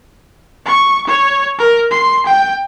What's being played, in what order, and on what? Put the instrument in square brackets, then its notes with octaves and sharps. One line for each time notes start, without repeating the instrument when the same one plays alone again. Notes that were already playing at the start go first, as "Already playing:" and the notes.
[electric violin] C#6
C#5
A#4
C6
G5